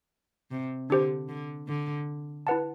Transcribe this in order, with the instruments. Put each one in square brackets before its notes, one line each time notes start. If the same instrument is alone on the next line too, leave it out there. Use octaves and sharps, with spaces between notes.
[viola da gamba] C3
[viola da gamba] D3 [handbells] D4 G4 C5
[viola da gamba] D3
D3
[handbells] E4 B4 F#5 A5